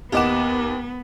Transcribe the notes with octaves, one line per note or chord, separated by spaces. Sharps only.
D#2 B3 G4 D#5 F#5 D6 E7